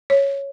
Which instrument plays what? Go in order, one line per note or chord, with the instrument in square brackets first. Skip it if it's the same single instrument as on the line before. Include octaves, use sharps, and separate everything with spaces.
[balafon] C#5